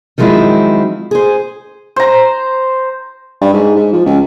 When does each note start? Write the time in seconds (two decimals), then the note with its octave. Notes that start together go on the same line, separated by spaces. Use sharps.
0.18 D#3 F3 F#3 G#3 C4 E4
1.11 G#4 C5
1.96 C5 A#5
3.41 G2
3.54 G#2
3.76 G#2
3.93 F3
4.06 C#2